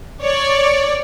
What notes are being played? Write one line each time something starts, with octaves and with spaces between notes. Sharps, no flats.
C#5 D5